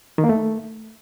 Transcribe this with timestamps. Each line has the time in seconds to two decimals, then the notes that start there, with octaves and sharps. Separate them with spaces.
0.18 D#3
0.24 A#3
0.29 A3